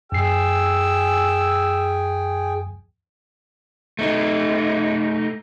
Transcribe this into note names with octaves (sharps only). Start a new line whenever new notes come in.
F#2 G#4 G5 G#5 E6 C7
A3 D#4